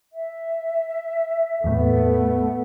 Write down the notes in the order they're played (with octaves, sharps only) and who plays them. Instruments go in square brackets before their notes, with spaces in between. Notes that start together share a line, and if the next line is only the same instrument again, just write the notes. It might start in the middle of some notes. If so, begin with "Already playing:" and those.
[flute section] E5
[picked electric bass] E2 A2 [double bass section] A3 B3